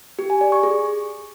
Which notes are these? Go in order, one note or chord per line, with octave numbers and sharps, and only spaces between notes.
G4
G#5
D5
C#6
G#4